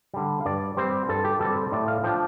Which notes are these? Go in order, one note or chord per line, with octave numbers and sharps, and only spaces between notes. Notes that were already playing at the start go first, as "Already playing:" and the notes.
D3 G3
F5
G2 D5
G3 C4 C5
G2 A4
G4
G3 C4 A4
C5
A2 D5
F5
F3 D4 G5